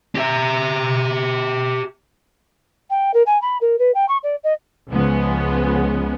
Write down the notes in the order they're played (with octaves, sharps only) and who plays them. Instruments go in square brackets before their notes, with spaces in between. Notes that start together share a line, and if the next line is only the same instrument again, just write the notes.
[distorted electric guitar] G4 E5
[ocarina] G5
A#4
G#5
B5
A#4
B4
G5
C#6
D5
D#5
[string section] C#2 F3 G#3 B3 C#4